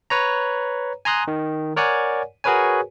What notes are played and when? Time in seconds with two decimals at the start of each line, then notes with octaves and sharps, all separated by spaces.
0.10 B4 C#5 A#5
1.05 G#5 A#5 C6 D#6 F#6
1.28 D#3
1.76 A#4 C#5 D5 F#5 G#5
2.44 F#4 G#4 A#4 B4 C#5 G#5